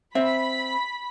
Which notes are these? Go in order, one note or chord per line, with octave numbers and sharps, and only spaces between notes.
C4 E5 B5